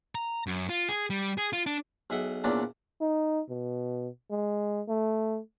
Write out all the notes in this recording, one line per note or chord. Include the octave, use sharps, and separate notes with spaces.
A#5
F#2
F4
G#4
G3
G#4
F4
D4
B1 G#4 E5 F#5 G5
E2 A#2 E3 B3 C#4 D4
D#4
B2
G#3
A3